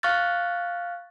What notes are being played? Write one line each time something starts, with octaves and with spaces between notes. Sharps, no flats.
F5 C#6 F6 F#6 A6